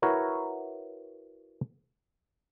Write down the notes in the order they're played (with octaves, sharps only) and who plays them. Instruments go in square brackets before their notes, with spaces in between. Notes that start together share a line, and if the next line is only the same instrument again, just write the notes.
[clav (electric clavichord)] E4 F#4 A#4 B4 C#5